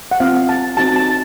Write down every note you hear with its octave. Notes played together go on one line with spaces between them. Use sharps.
F#5
C4 F4 F5
A5
C4 D#4 F#4 A5
A5